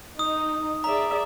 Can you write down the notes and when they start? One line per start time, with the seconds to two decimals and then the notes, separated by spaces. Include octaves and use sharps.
0.19 D#4 D#6
0.84 G#4 D5 E5 A#5